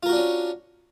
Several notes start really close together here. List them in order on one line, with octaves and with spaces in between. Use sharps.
F4 A#4 F#4 D4 C#4